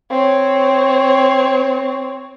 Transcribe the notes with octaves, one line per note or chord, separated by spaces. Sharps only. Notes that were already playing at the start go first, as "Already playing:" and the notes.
C4 C#5